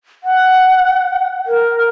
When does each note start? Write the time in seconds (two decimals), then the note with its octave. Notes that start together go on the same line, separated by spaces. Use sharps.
0.24 F#5
1.46 A#4